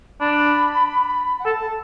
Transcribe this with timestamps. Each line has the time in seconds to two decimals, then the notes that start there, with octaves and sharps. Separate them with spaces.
0.20 D4 B5
1.40 F#5
1.45 A4 A5